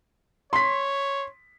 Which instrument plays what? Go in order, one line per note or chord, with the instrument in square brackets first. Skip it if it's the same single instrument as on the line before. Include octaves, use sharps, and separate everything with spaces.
[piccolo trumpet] C#5 [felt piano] C6 B6